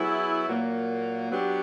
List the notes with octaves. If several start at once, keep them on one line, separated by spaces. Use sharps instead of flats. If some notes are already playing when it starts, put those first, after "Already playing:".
Already playing: F#3 B3 E4 G#4
A#2 F#3 A#3
F#3 B3 D4 G4